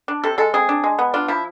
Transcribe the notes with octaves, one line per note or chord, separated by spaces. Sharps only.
D4
C3 A4
G#3 A4
C4 G#4
D4
G#3
B3
D4 F4
F3 E4